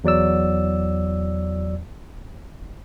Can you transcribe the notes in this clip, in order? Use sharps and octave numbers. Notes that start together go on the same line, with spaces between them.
E2 F#3 D5 E6